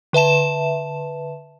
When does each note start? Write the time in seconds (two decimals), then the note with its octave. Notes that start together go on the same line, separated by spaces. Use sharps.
0.13 D3 B4 E5 A5 E7